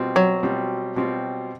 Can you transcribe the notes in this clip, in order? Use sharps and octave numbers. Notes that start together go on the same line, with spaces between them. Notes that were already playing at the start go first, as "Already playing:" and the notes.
Already playing: B2 G3 C4 F4
F#3
B2 G3 C4 F4
B2 G3 C4 F4